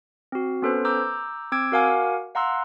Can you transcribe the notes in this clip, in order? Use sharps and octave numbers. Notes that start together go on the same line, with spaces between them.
C4 F#4
B3 C#4 A4 B4 C5
A#5 D6 E6 G6
C4 D6 E6 G#6 D7
F#4 A#4 F5 F#5 G#5 D6
F5 F#5 A#5 C6 E6 F#6